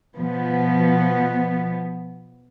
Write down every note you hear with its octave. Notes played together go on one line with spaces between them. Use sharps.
B2 F3 B3